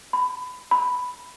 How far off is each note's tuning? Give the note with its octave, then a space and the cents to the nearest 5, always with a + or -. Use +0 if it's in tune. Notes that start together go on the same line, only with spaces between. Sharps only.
B5 +25
B5 +5